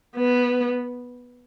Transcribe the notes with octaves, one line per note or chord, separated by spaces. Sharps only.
B3